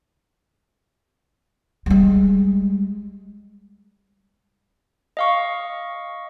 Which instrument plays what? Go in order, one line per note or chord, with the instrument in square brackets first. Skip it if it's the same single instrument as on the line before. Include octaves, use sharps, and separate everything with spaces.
[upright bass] G3 G#3
[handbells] D#5 F5 C#6